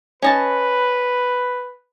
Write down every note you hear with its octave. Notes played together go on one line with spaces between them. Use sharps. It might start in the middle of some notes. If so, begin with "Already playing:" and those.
C#4 B4 D#5 A5